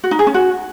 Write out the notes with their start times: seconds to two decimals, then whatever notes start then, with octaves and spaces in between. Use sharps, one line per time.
0.04 F#4
0.11 D#4
0.19 G#4
0.27 C#4
0.34 F#4